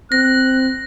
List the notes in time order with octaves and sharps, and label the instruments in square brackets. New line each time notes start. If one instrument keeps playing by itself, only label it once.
[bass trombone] C4 [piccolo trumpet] F#6 [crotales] A#6